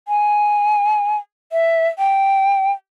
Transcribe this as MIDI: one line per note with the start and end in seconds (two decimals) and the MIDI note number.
0.08 1.16 80
1.52 1.88 76
1.99 2.71 79